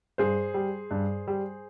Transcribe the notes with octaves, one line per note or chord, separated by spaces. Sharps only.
G2 G#4 C5
G3
G2
G3